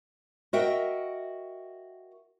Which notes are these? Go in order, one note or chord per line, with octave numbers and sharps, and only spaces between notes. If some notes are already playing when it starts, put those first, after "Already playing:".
F#4 A#4 D#5 E5 F#5 G5